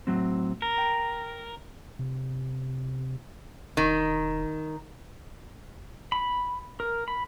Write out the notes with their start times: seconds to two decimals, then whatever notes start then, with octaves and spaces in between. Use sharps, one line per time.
0.07 A2 F#3 C4
0.62 A#4
0.78 G5
1.99 C3
3.77 E1 D#3
6.12 B5
6.80 A#4
7.08 B5